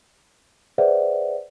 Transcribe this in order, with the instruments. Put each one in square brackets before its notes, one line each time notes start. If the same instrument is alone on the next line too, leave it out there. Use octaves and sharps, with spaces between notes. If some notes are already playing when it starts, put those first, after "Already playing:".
[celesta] G#4 B4 C5 D5 E5 F#5